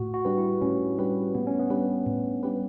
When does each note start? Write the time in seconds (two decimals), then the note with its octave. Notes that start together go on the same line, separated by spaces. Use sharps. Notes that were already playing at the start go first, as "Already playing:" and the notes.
Already playing: A2 F#4
0.14 F#4
0.25 G3 D4 G4 B4
0.38 E4
0.61 A2 C#4
0.98 G3 D4 G4 B4
1.35 A2 B3
1.47 C#4
1.59 B3
1.70 G3 D4 G4 B4
2.06 A2
2.43 G3 D4 G4 B4